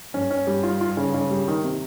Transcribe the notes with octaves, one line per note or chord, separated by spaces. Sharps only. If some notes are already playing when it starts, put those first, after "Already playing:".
G2 C#4
C#4
G3
F4
F4
C#3
C#3
G3
D#3
C3